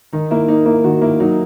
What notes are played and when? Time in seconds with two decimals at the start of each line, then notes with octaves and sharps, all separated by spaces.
0.13 D#3 D#4
0.31 A#3 E4
0.48 A#3 D#4
0.66 A#3 E4
0.84 D#3 F#4
1.01 A#3 E4
1.20 F#3 D#4